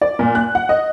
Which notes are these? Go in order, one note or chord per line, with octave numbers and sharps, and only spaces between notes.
D5
A#2
F#6
F#5
D#5